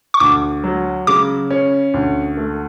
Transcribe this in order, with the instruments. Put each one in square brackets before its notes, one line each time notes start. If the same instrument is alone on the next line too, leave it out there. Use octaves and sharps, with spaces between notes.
[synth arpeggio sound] C#6
[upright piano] D2 [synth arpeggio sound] D6
[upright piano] F#3
[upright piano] C#3 [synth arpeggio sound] D6
[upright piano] C#4
D2
A3